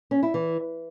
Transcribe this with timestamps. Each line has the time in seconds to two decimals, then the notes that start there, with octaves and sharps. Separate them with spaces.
0.11 C#4
0.23 E4
0.34 E3